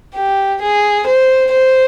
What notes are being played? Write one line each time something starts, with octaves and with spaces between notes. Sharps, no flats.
G4
G#4
C5
C5